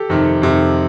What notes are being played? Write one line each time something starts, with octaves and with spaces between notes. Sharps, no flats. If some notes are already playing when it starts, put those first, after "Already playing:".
Already playing: G4 A4
F2 C3 D#3
F2 C3 D#3